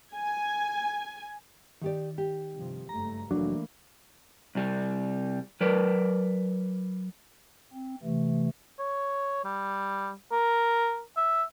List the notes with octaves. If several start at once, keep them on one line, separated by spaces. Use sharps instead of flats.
G#5
D#3 D#4 G4 D5
G4
G2 C3 F3
F#1 G2 A3 A#5
F1 E3 F#3 A3 A#3 D4
C2 G3
F#3 A#4 B4 D5
C4
C3 E3 A3
C#5
G3
A#4
E5